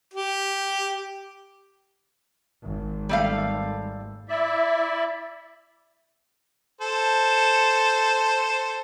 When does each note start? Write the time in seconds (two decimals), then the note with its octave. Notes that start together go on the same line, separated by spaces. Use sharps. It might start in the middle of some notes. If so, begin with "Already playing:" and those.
0.14 G4
2.64 G#1
3.09 G3 A3 F5
4.28 E4 D5 E5
6.81 A4 C5